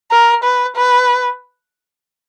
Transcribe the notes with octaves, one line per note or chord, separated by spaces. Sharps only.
A#4
B4
B4